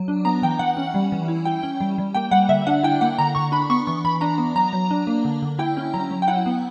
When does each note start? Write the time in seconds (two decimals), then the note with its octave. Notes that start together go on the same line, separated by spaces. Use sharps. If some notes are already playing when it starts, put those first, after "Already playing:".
Already playing: F#3
0.08 D4
0.25 B3 A#5
0.42 E3 G5
0.59 E3 F#5
0.77 C#4
0.94 G3
1.12 E3
1.28 E4
1.45 E4 G5
1.63 C#4
1.81 G3
1.98 G3
2.14 A#3 G5
2.31 G3 F#5
2.49 D3 E5
2.67 D4 F#5
2.83 E4 G5
3.01 A#3 F#5
3.18 D3 A#5
3.35 D3 C#6
3.52 D4 B5
3.70 B3 C#6
3.87 E3 C#6
4.05 E3 B5
4.21 D4 A#5
4.38 B3
4.56 F#3 A#5
4.73 F#3
4.91 D4
5.07 A#3
5.25 D3
5.42 D3
5.59 E4 G5
5.77 C#4
5.94 F#3 A#5
6.11 F#3
6.22 G5
6.28 E4 F#5
6.46 B3